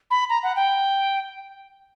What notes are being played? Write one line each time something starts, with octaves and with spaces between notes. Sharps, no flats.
B5
A#5
F#5
G5